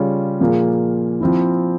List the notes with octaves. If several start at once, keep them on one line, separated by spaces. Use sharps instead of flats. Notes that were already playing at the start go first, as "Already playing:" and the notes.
Already playing: C#3 G3 C#4 F4
A#2 F3 A#3 F4 G#4
F3 C4 E4